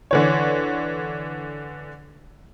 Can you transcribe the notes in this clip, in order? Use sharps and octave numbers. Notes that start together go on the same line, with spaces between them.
D3 E3 C#5